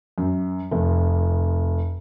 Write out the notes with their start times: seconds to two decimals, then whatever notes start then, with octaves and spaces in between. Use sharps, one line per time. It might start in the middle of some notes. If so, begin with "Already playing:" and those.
0.18 F#2
0.71 F1